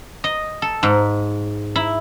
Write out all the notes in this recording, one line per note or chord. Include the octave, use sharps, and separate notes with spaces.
D#5
A4
G#2
E4